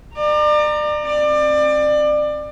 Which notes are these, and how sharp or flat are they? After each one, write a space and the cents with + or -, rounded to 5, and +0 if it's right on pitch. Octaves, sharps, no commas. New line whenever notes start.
D5 +35 A#5 +0
C4 +35 D5 +30